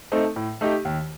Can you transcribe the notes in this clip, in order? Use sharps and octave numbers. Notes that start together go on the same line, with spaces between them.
A3 C4 D#4 A4
A2
A3 D#4 G4
D#2